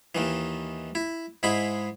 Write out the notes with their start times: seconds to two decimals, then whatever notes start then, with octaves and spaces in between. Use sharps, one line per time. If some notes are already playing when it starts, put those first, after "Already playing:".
0.15 D#2 D#3 E3
0.95 E4
1.43 G#2 G#3 E4 B5